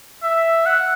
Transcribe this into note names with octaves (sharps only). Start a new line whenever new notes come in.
E5
F#5